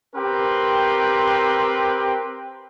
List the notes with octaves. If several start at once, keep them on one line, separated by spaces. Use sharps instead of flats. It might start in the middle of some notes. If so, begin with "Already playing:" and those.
C4 G4 A#4 B4 G5 C6